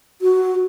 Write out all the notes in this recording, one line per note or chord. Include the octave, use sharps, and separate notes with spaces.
F#4